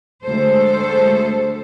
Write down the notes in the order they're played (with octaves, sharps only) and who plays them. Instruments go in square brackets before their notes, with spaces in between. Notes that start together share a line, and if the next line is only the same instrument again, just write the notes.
[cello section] D2 G#3 A4 C5